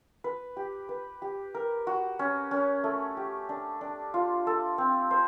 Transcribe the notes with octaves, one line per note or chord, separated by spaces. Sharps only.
B4
G4
B4
G4
A#4
F#4
C#4
C#4
A3
G4
D4
D4
F4
A4
C4
C5